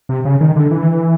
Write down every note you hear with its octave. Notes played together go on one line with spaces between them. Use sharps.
C3
C#3
D#3
D3
E3